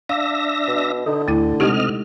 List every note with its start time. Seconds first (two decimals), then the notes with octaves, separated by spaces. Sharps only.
0.09 D4 E5 F5 A#6
0.68 B2
1.06 D3 D#4
1.28 D2 A3 E4
1.60 C3 G#3 D#4 G4 D#5 F6